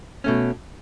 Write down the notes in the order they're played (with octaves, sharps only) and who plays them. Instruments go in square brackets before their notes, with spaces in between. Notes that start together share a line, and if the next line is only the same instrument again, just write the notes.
[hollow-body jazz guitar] B2 A3 C#4